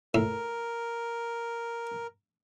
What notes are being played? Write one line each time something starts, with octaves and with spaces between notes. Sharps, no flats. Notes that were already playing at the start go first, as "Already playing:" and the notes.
A2 A#4